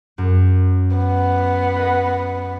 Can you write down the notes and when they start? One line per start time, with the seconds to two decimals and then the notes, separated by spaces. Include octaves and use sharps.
0.18 F#2
0.96 B3
1.76 B4 D#5